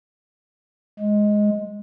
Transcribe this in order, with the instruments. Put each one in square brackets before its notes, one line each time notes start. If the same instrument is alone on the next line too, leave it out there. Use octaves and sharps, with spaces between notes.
[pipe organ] G#3